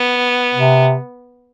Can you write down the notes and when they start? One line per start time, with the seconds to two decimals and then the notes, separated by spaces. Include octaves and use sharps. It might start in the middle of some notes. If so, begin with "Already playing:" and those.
Already playing: B3
0.54 C3